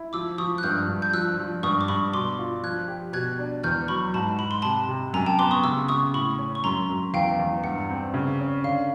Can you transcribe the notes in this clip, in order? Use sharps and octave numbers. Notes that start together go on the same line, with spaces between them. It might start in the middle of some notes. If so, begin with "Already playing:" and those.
Already playing: E4
F3 D6 E6
F3 C#6 D#6
F#6
G2 F6 G6
G2
G6
F3 E6 F#6
F3
G2 C#6 D#6
D6
G2 B5 C#6
B2 C6 D6
F4
F3 F#6 G#6
G4
B2 F#6 G#6
D4
E2 F6 G6
F#3 B5 C#6
G#2 A5 B5
G#2 B5
C6
C3 A5 B5
C3
F#2 G#5 A#5
G5 A5
B3 C6 D6
C#6 D#6
C#3 D6 E6
C#3 C#6 D#6
A2 B5 C#6
C#4
C#6
F#2 A#5 C6
F#2
E2 F5 G5
E2
G2 F#5
C4
C#3
C#4
D3 F5